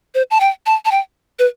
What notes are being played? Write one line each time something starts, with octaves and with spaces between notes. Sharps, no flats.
C5
A5
G5
A5
A5
G5
B4